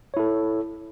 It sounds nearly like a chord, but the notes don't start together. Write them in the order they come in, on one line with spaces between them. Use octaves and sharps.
C#5 E4 A4